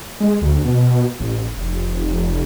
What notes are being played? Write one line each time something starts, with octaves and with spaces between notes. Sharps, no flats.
G#3
D2
B2
A1
F1